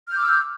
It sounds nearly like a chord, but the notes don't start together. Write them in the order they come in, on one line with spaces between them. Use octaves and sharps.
F6 G6 D6 E6